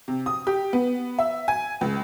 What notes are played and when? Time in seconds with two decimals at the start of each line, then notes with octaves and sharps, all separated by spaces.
0.08 C3
0.26 D#6
0.47 G4
0.73 B3
1.18 E5
1.48 G#5
1.81 C#2